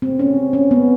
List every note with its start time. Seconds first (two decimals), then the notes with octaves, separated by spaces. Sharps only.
0.02 C4
0.19 C#4
0.53 C#4
0.71 B3